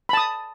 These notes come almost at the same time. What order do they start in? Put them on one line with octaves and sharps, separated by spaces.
B5 A5 D#6